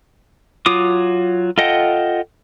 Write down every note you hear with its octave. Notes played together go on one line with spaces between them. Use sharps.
F#3 F4 D6 D#6
F4 A4 D#5 F#5 G5